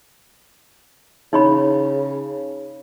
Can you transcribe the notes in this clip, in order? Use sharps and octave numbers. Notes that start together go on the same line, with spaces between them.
C#3 D#4 C#5 B5